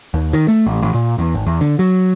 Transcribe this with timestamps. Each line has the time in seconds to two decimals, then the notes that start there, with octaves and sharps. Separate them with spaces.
0.14 D#2
0.33 D#3
0.48 A3
0.67 A1
0.82 A1
0.94 A#2
1.18 E2
1.34 G#1
1.47 E2
1.61 D3
1.79 F#3